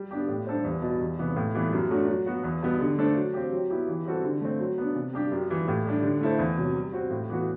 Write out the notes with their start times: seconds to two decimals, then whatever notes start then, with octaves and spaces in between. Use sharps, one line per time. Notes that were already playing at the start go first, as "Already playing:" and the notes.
Already playing: G3
0.11 B3 D4 G4
0.28 A2
0.47 G3 D4 A4 C5
0.64 E2
0.82 B2 G3
1.01 E2
1.19 C3 E3 B3
1.36 A2
1.55 E3 G3 B3
1.73 F#2
1.90 F#3 A3 D4 F#4
2.09 F#3
2.26 B3 F#4
2.44 E2
2.63 B2 G3 B3
2.80 D3
2.98 A3 D4 A4 C5
3.16 F#3
3.34 C4 G4
3.52 F#3
3.70 B3 E4 G4
3.88 E3
4.05 G3 C4 F#4 A4
4.24 D3
4.41 A3 C4
4.60 F#3
4.78 B3 D4
4.96 C3
5.13 G3 D4 G4
5.32 F#2
5.50 E3 G3
5.68 A2
5.86 G3 D4
6.03 D3
6.21 A3 E4 A4 C5
6.39 E2
6.57 C3 F#3
6.75 G3
6.93 C4 F#4
7.10 A2
7.29 E3 B3 F#4